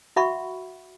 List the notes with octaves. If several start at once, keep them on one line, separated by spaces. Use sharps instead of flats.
F#4 E5 F#5 B5 C#6